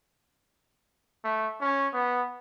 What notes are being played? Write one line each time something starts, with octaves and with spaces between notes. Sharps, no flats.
A3
C#4
B3